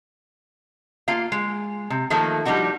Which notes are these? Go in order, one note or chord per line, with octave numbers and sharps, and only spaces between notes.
A#3 F4 F5
G#3
C3
D#3 F3 A3 A#3
F3 G3 D4 D#4 F#4